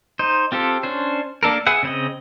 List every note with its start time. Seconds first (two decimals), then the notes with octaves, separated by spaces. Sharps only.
0.19 D#4 C5
0.52 C4 F4 G4 A4
0.83 C#4 D4 C5
1.43 A#3 D4 A4 A#4
1.67 G#4 B4 E5 F#5
1.83 C#3 C4 D#5